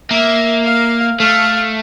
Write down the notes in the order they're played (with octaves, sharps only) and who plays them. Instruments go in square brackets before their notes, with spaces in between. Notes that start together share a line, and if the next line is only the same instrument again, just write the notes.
[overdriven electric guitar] A#3 [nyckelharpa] E5
[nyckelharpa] F5
[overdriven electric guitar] A3 [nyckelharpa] F5